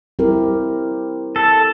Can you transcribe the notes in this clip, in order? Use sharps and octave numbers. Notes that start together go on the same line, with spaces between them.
G3 C4 E4 G4 A#4
A4